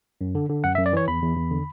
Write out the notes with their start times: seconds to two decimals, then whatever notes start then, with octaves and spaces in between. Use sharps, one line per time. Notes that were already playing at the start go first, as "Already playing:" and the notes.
0.21 F#2
0.35 D3
0.49 D3
0.64 F#2 F#5
0.75 E5
0.78 F#2
0.86 D5
0.93 E3 C#5
1.08 E2 B5
1.23 E2
1.37 E2
1.51 D3